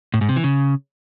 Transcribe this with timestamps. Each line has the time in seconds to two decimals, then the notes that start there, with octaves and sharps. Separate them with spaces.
0.14 A2
0.21 G#2
0.29 C3
0.36 E3
0.44 C#3